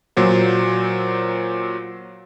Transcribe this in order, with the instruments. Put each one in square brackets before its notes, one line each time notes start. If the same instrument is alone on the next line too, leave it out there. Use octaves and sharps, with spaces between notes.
[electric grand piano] A#2 F#3 C5